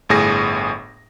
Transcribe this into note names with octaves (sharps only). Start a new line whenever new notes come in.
G1 A2 G#4 A#6